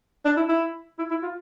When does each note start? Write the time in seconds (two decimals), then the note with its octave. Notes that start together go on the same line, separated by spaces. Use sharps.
0.25 D4
0.37 E4
0.49 E4
0.98 E4
1.10 E4
1.22 F4